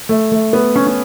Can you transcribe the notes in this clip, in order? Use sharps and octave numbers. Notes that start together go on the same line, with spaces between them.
A3
A3
B3
C#4
C#4